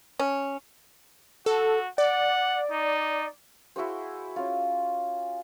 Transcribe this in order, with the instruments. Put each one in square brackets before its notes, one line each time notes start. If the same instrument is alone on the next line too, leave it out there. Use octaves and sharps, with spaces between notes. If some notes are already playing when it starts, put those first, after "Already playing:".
[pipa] C#4
[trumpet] F#4 [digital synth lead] A4
[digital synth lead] D5 [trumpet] F#5
[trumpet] D#4
[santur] E4 F#4 G#4 C5
C#4 F4